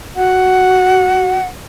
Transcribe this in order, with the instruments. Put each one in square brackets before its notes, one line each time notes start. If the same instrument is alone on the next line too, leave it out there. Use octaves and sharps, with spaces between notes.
[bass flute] F#4 [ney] F#5